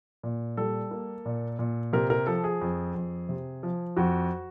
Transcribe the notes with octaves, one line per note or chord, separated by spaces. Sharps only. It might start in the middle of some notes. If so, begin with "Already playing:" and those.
A#2
G3 A4
A#3
A#2
A#2
C3 A#4
A#4
F3 A4
G#4
F2
F2
C3
F3
F2 F#4